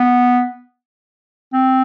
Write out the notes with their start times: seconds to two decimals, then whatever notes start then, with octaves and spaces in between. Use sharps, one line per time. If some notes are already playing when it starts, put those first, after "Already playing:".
Already playing: B3
1.53 C4